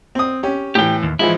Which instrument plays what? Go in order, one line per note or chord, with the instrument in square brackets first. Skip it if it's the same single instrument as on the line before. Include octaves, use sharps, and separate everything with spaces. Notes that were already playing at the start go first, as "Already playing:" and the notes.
[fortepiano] C4 D#6
C#4 G4
[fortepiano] A2 E3 [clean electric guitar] G4 G5
[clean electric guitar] D#2
[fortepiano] E3 F3 G#3 [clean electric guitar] E4